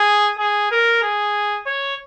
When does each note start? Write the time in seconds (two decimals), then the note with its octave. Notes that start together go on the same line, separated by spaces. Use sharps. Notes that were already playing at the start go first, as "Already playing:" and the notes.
Already playing: G#4
0.39 G#4
0.71 A#4
1.03 G#4
1.66 C#5